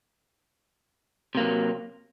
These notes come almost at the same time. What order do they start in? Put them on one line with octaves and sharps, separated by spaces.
C3 A#3 F#3